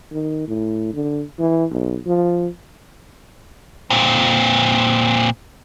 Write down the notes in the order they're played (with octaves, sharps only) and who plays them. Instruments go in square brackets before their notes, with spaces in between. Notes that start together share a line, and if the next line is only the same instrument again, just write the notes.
[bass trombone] D#3
A2
D3
E3
B1
F3
[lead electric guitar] A#2 C4